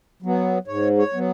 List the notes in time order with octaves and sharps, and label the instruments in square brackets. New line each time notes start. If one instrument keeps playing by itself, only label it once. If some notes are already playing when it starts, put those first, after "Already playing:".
[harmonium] F#3 B3
G#2 C#5
C#5
F#3 B3